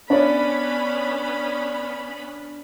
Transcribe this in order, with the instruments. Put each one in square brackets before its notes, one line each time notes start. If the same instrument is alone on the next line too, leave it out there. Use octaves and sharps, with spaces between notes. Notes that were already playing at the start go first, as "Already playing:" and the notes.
[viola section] B3 C#4 B5 [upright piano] D4 C#5 D5